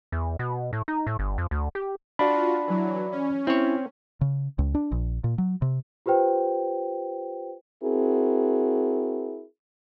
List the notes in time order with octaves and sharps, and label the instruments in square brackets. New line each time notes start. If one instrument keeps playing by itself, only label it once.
[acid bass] E2
B2
A2
D#4
A2
G1
F2
D2
G4
[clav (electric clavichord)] D4 [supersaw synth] F4 F#4 [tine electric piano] D5 B5
[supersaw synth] E3 F#3
C#4
[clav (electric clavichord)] C4 C#5 [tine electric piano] E4
[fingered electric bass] C#3
C#2
D4
A#1
A#2
F#3
C3
[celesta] F4 G4 B4 C5 G5
[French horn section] C4 E4 F#4 G#4 A#4